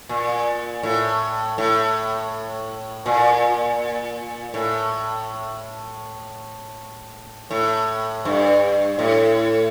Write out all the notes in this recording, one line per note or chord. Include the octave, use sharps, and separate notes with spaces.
A#2
A2
A2
A#2
A2
A2
G2
A2